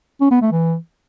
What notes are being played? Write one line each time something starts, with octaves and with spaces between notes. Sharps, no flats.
C#4
B3
A3
E3